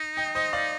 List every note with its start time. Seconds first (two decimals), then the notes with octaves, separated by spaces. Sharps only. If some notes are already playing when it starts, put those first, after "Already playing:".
Already playing: D#4
0.17 D#5 G5
0.35 C5 D#5
0.53 D5 F5